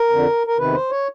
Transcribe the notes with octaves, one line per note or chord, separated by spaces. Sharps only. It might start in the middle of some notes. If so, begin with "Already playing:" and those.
Already playing: A#4
F2 D3
A#4
E2 C3 D#3 B4
C5
C#5